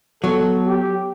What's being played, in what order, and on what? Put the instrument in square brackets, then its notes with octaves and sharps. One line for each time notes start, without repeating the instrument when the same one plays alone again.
[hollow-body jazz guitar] F#3 [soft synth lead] B3 [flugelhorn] A4
[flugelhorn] G4